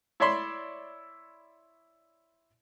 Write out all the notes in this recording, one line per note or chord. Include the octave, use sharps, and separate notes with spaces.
E4 C#5 D5 E5 B5 C6